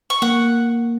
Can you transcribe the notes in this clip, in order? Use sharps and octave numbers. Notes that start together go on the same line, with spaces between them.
C#6
A#3 F#5